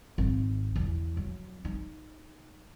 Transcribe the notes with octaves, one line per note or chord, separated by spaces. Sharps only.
G#1
E2 E3
F#3
D#4